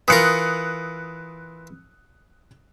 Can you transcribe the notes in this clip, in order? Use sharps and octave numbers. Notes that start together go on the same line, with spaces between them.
E3 F4 A#4 D#6 F#6 C#7